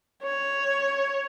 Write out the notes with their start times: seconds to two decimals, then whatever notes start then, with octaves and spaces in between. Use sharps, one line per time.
0.23 C#5